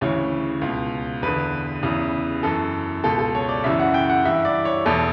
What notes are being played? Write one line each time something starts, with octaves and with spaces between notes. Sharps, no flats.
D2 C#3 E3 C#5
C#2
B2
E2 D3 B4
E2 C#3 E3
F#2 E3 A4
C#2 B2 A4
A4
C#5
D5
F#2 C#3 E3 E5
F#5
G5
F#5
G2 E3 E5
D5
C#5
E2 B2 A4